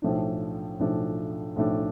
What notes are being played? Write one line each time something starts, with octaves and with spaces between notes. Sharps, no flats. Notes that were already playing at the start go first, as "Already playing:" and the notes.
B1 A2 F3 A3 D4
B1 A2 F3 A3 D4
B1 A2 F3 A3 D4